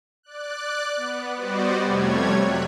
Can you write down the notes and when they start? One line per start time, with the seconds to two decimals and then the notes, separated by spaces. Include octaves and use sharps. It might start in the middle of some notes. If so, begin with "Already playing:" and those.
0.23 D5 F#6
0.96 B3
1.36 G3 B3 F#4 C5 D5 D#5
1.82 F2 C3 G3 A3 C#5 G#6
2.36 F#3 F#6 B6